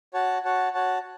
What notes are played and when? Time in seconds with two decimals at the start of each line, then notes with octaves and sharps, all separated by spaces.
0.14 F#4 C#5 F#5 A5
0.45 F#4 C#5 F#5 A5
0.74 F#4 C#5 F#5 A5